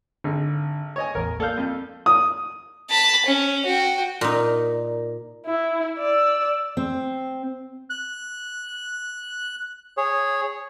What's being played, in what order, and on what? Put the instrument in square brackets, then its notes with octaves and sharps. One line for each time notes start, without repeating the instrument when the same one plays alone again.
[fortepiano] G#1 [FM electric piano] D3
[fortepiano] C#5 D#5 G#5
[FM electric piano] A1 E2 [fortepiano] A#4
[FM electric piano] A#3 G6 [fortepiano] A4 D5 F5
[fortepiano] F2
D#6
[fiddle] A5 B5
C#4
F#4 G5
[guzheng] A#2 D#4 [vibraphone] A#4 D5
[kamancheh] E4
D5 E6
[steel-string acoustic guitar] C4
[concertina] F#6
G#4 C#5